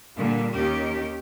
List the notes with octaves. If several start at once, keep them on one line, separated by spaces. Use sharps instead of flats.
A#2 D3 G3
D#2 D#3 C#4 G4